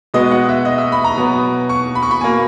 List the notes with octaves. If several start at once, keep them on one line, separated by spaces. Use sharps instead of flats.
B2 G#3 B3 D#5
F#5
E5
D#5
E5
B5
A#5
B2 F#3 B3
C#6
B5
C#6
B5
B2 A#3 G#5